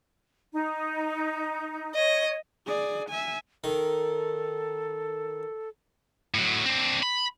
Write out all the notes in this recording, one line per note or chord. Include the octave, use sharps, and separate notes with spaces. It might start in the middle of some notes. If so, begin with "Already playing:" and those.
D#4
C#5 D#5
G#4 D5
E5 G#5
D#3 A4
A2 F#3
C4 D4
B5